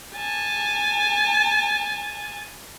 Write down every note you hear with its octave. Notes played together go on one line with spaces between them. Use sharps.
G#5 A5